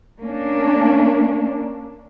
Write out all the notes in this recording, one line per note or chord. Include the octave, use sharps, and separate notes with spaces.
A#3 C#4 D4